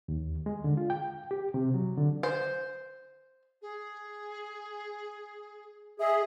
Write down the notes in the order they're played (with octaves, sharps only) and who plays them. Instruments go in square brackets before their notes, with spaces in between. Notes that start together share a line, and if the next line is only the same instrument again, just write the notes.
[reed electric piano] D#2
G#3
D3
F4
G5
G4
C3
F#3
D3
[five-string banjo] C5
[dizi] G#4
[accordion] G#4 [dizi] D#5 [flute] E5